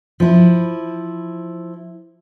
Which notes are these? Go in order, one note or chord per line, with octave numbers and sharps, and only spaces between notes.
F3 E4